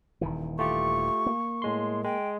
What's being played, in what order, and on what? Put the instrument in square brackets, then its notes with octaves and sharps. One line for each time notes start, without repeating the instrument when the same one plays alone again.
[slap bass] D#1 D#3 E3
[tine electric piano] A3 F4 G4 [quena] C#6
[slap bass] A#3
[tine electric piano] A2 G#3 C6
[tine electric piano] G#3 [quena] G5